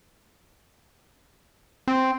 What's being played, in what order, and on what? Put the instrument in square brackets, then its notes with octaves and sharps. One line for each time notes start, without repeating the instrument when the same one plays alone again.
[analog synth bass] C4